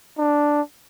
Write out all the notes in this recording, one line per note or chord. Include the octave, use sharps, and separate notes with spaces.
D4